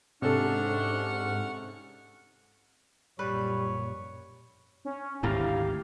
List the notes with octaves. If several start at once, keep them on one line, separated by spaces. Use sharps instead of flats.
G#2 C3 C#4 D4 A4 F#5 C#6 F6
A#1 F#2 A#2 G3 B4 C#5
C#4
G#1 D2 G#2 E4 G4 F5 A#5